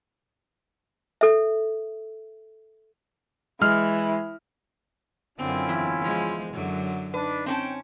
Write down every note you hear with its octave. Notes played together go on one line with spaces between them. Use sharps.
A4 E5
E3 G#3 F6
F#2 D3 C4 C#4 E4 F4
E2
F3 G#3
F#2 D3 F#3
D4 D#4 B4
C4 C#4 G5 A5